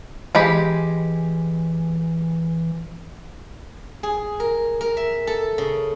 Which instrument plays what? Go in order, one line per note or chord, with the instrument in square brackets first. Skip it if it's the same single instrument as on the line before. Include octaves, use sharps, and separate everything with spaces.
[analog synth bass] E3 [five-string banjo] G#3 G4 B5
[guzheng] G#4
A#4
A#4
E5
A4
C#3